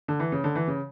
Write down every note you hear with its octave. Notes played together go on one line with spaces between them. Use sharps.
D3
E3
C#3
D3
E3
C#3